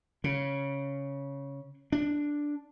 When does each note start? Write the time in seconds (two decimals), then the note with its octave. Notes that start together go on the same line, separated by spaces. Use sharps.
0.24 C#3
1.92 D4